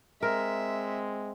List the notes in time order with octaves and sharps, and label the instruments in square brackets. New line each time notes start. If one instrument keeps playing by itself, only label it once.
[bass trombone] G#3 [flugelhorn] C4 [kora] A#4 [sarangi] E5